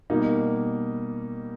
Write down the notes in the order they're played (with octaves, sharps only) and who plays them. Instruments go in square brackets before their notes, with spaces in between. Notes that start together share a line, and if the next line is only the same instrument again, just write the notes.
[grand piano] B2 G3 A#3 D#4